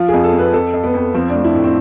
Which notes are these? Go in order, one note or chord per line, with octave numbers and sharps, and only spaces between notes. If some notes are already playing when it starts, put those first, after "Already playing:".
Already playing: F3 F4
G#4
F2
A4
F2
B4
F2 A4
F2
B3
F2
F3 C4
A3 D4
E4
A2
C4